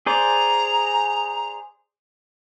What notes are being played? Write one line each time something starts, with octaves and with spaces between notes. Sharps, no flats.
G#4 C5 D5 A#5